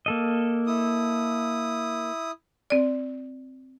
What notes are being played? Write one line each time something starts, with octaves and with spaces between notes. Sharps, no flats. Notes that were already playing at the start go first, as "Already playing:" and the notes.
A#3 A4 D#5
E4 D#6
C4 D5